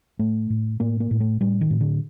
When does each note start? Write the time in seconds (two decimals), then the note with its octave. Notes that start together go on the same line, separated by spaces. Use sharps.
0.19 A2 A3
0.50 A2
0.80 A2 A#3
1.00 A#3
1.11 A2
1.20 A3
1.41 A2 G3
1.61 D#3
1.70 A2
1.81 D3